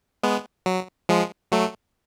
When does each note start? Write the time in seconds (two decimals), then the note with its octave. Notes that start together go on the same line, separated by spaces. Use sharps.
0.23 G#3 B3
0.66 F#3
1.09 F3 G#3
1.52 F#3 A3